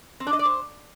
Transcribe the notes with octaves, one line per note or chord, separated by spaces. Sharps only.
C4
D4
D#5
D5
C5